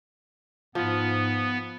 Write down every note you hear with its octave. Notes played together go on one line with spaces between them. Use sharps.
G#2 F3 B3